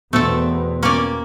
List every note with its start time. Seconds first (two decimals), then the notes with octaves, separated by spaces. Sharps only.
0.13 E2 B2 A3 C4 A4
0.83 A#3 C#4 D5